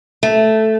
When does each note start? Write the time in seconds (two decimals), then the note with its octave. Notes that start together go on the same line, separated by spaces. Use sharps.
0.23 A3